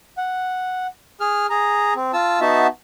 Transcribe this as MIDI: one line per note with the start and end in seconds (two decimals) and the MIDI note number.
0.17 0.87 78
1.20 1.46 68
1.20 1.46 89
1.50 1.94 68
1.50 1.94 82
1.96 2.12 60
2.13 2.40 65
2.13 2.40 81
2.13 2.40 88
2.41 2.67 59
2.41 2.67 63
2.41 2.67 66
2.41 2.67 76
2.41 2.67 81